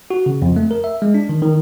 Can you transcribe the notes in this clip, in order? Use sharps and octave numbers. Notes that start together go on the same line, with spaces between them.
F#4
C#3
F2
A3
A#4
E5
G#3
D4
D#3
D#3